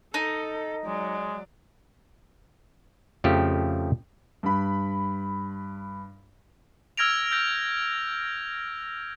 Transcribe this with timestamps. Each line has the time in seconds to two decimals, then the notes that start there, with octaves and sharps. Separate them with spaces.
0.14 D#4 A4
0.86 F#3 G#3 D5
3.24 F2 C#3 F3 A3 G4
4.43 G2 B5
6.97 E6 F6 G#6 A#6 D7 F7
7.31 E6 G6 A#6